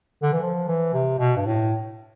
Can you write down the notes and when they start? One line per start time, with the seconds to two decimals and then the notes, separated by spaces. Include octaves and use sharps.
0.23 D3
0.33 E3
0.42 F3
0.68 E3
0.94 C3
1.19 B2
1.36 G2
1.46 A2